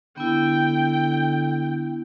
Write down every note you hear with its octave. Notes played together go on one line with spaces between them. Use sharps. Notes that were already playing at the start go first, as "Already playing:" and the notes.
D3 B3 E4 G5